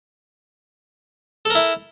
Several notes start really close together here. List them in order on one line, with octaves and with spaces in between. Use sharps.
A4 A#4 E4